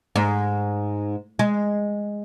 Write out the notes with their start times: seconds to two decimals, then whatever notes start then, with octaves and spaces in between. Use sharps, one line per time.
0.16 G#2
1.39 G#3